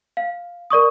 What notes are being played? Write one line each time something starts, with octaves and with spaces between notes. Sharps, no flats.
F5
A#4 D5 C#6 D#6